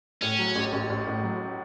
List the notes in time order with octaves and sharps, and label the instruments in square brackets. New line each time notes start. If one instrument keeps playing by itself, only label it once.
[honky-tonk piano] A2 [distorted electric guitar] C#4
[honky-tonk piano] F#3
A1
A1
A1
A2
F#3